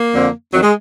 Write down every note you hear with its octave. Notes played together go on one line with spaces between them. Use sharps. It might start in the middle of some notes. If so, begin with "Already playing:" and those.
Already playing: A#3
F2 D3 F3
F2 D#3 F#3
G#3